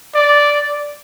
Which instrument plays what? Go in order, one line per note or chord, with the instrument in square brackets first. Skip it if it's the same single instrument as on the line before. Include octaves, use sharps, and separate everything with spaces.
[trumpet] D5